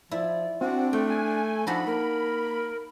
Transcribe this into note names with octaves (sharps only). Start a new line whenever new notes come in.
F3 E4 D5
C4 D4 F#4
A3 G5
G#5
F3 D4 D#4 F#4 A4 B5
A#3 A#4